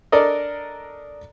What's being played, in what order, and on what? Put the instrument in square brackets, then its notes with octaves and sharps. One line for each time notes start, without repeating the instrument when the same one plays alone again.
[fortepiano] D4 A4 A#4 D5 D#5